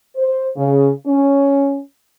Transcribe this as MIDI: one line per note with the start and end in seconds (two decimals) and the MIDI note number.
0.17 0.48 72
0.57 0.90 49
1.07 1.80 61